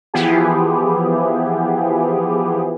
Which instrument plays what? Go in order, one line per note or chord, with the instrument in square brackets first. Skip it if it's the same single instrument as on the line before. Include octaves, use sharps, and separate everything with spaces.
[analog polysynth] E3 F3 B3 E4 G4 G#4